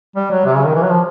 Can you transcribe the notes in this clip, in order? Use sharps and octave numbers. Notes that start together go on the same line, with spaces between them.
G3
F#3
C3
C#3
D#3
E3
F#3
F3